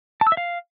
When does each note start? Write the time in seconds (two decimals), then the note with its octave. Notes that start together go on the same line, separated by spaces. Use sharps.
0.21 A5
0.27 E6
0.32 E5
0.37 F5